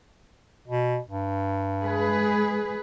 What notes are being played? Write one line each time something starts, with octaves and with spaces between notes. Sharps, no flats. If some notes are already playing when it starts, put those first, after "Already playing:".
B2
G2
G#3 G#4 B4